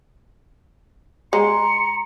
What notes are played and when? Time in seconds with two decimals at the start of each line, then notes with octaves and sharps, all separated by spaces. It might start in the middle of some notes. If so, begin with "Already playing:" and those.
1.33 G#3 A#5 C6 C#7